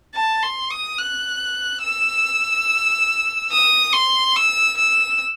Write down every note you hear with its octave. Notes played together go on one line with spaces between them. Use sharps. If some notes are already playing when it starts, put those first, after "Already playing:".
A5
C6
D#6
F#6
E6
D#6
C6
E6
E6